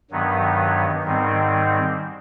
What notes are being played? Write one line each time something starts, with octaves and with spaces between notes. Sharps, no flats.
G2 D#3 F#3 B3
G#2 D#3 G3 C4